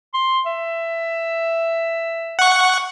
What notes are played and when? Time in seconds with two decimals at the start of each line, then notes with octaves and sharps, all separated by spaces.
0.14 C6
0.46 E5
2.39 F#5 C#6